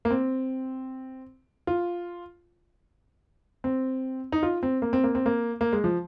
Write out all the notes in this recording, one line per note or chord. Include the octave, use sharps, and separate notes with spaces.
A#3
C4
F4
C4
D#4
F4
C4
A#3
C4
A#3
C4
A#3
A#3
G#3
F3